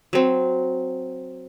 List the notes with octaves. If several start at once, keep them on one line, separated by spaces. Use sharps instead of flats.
F#3 C4